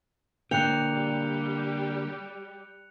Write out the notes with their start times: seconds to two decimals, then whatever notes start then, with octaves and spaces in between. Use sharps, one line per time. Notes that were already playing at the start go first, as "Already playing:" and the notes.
0.51 D3 A#3 G5 F#6 C#7 F7
0.94 G3 G4